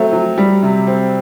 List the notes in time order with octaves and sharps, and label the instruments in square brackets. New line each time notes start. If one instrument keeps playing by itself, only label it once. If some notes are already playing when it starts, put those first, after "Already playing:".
Already playing: [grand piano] F#3 A3 C4
F#3
G3
C3
C4